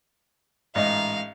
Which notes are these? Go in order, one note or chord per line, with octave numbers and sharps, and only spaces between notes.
A1 G#2 D#5 F5